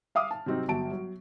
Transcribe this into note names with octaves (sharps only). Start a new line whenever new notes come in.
E5 F5 D6 D#6 F6
A5
C3 F#3 C4 D#4
G1 F#3 A5 D7
F#3